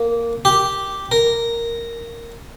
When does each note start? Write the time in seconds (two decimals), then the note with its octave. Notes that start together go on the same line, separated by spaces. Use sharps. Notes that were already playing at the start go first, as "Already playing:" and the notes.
Already playing: A#3
0.45 G4
1.12 A#4